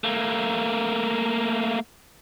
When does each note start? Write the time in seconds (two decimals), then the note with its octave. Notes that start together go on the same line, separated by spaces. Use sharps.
0.04 A3 A#3